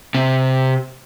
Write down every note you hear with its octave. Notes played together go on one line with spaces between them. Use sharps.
C3